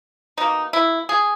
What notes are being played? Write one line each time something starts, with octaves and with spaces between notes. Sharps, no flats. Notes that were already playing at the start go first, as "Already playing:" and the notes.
B2 A#3 D#4
E4
G#4